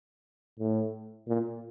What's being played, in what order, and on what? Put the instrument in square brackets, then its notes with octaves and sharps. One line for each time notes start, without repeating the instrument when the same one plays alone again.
[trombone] A2
A#2